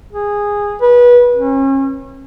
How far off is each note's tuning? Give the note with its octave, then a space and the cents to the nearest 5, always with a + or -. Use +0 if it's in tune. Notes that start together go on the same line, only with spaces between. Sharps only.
G#4 -15
B4 -25
C#4 -35